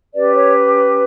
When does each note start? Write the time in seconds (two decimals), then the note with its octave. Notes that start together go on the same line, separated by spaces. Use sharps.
0.13 C#4 G4 B4 D5
0.34 C#5